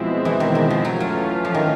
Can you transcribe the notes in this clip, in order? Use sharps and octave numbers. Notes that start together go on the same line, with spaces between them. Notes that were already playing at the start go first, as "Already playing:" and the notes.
Already playing: B2 F3 G#3 C4 E4
E3
D#3
D#3
F3
E3 F#3 A3 C#4 F4
F#3
F3
D#3